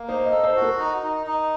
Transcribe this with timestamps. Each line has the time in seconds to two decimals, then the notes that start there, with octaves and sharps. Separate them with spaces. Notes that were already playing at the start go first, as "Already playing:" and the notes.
Already playing: A#3
0.08 D#4 C5
0.26 D#5
0.32 A4
0.43 C5
0.56 F#4
0.62 A#4
0.79 D#4
1.03 D#4
1.27 D#4